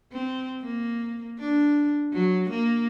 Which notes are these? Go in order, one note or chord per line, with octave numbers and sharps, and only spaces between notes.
C4
A#3
D4
F#3
A#3